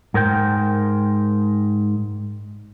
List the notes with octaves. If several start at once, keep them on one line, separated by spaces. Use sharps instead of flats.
G#2 A#4 C5 G5